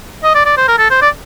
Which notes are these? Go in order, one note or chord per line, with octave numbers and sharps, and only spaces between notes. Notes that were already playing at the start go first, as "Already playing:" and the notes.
D#5
D5
D5
C5
A#4
A4
C5
D5